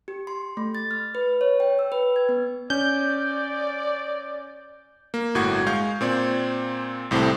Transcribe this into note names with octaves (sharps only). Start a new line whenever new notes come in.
G4
C6
A3
A6
F6
B4
C#5
G5
E6
B4
G#6
B3
C#4 D5 G6
A#3
G1 A2 F#4 C#6 G#6
G#3 F5 C#6 G6
A#2 C4 D5
C2 A2 C3 C4 E4 A4